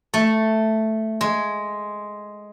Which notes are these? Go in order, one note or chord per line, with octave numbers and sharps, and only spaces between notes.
A3
G#3